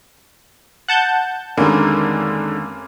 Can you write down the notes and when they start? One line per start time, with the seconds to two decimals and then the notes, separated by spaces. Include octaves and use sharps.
0.88 F#5 A5 G6
1.57 F1 D3 D#3 G#3 A#3 C#4